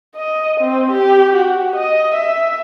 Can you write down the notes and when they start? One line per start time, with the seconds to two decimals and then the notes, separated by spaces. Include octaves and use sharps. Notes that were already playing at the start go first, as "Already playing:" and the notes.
0.16 D#5
0.60 C4
0.91 G4
1.36 F#4
1.76 D#5
2.15 E5